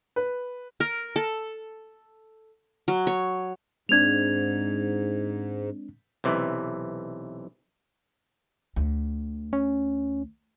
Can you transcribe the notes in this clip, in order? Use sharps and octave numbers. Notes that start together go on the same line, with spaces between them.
B4
A#4
A4
F#3
C#5
G#2 G#3 C4 D4 G#6 F7
B1 C3 E3
D2
C#4